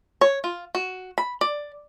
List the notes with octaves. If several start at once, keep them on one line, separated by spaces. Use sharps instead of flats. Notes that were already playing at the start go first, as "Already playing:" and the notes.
C#5
F4
F#4
B5
D5